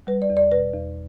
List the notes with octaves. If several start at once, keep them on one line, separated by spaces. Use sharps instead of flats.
G3 B4
D5
E2
D5
B2 B4
E2